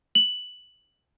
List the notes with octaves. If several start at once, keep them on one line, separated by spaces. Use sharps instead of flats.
F#7